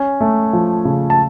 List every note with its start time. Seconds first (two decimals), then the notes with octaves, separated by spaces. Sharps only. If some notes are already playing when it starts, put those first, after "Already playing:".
Already playing: C#4 G#5
0.21 A3
0.53 F3
0.85 C#3
1.10 A5